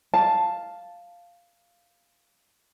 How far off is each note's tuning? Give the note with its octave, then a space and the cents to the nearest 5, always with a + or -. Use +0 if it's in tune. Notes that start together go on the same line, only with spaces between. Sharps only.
F5 +0 A5 +0